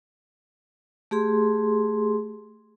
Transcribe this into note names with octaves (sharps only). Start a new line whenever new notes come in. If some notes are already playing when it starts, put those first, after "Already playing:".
A3 G4 G#4 C6